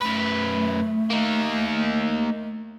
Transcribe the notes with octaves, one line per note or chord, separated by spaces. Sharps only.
F#2 A3 B4
A#3 D#4